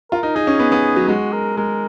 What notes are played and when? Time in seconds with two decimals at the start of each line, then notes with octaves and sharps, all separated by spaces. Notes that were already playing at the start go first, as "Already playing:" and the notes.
0.12 F4 A#4
0.23 D#4
0.35 D#4 G#4
0.47 C#4
0.59 B3
0.72 B3
0.96 F#3
1.08 G#3 F#4
1.32 A#4
1.57 G#3 A#4